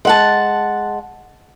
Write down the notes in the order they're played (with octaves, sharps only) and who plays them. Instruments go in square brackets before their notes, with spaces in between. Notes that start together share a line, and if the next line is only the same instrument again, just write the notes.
[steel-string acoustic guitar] G#3 F#5 A5